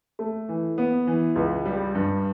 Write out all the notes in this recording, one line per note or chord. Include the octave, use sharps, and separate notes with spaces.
A3
E3
B3
E3
C#2
G3
G2